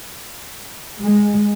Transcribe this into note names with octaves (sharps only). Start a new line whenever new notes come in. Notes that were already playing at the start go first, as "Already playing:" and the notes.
G#3